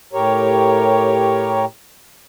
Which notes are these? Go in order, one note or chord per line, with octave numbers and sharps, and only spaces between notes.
A2 G4 A#4 C#5